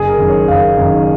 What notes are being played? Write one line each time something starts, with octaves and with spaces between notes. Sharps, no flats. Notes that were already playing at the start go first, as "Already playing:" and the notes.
Already playing: F#1 G#4
A#4
F#2 D#3
C#5
F#1 F5
F#2 D#3